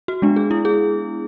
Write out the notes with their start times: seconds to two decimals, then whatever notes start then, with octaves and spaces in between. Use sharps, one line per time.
0.08 F#4
0.22 G#3 B3 D4
0.36 G#4
0.51 E4
0.65 G#4